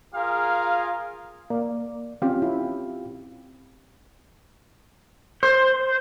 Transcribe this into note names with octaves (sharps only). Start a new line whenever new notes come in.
F4 G#4 A#4 F5
A#3 D5
C4 C#4 F4 G4 F5
E4
C5